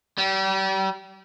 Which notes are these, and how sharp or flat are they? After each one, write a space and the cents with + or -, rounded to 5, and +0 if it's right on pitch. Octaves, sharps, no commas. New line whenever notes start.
G3 -35